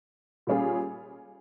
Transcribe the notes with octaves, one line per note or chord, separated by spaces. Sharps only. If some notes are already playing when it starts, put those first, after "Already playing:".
A#2 G3 C#4 F4 G#4